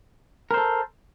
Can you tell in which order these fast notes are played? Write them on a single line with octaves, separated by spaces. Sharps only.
A#4 C5 A4